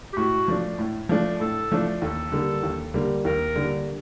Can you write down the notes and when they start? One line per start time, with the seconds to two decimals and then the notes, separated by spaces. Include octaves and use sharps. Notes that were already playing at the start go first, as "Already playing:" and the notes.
0.13 G4
0.17 A2 F#4
0.48 F3 A3 D4
0.79 A2
1.09 F3 A3 D4
1.40 A2 A4
1.72 F3 A3 D4
2.02 D#2 A4
2.32 D3 G3 A#3
2.63 D#2
2.94 D3 G3 A#3
3.25 D#2 A#4
3.56 D3 G3 A#3